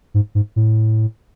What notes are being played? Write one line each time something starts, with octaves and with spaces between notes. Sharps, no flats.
G#2
G#2
A2